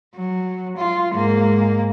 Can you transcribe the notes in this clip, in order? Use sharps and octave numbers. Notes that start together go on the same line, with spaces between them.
F#3
F4
G#2 A#3